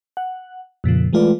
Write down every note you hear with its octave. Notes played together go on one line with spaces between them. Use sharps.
F#5
F2 A#2 C#3 F3
E3 G#3 A3 F4 B4 D5